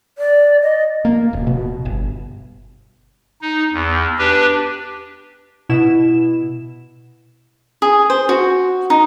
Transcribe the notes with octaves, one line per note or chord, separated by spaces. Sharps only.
D5
D#5
A#3
D#1
B2
G1
D#4
E2
D4 G4 B4
B2 E4 E7
G#4
C5
F#4
D#4